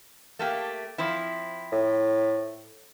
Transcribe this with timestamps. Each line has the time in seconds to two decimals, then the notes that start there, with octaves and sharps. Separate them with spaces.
0.39 A3 A#3 G4
0.98 F3 C4 E4
1.72 A2